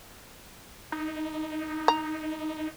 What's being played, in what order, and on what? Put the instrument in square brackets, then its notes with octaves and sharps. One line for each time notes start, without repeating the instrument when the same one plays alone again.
[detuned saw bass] D#4
[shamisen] A#5